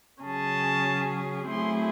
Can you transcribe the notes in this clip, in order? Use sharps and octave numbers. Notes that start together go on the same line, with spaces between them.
C#3 F#3 C#4 G#4 A5
F#3 A3 C4 E4 G#4 C6